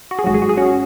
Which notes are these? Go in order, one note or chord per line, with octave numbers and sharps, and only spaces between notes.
F#4
G#4
G#1 G#2 F#3 F#4
G#4
F#4
G#4
C#4 F#4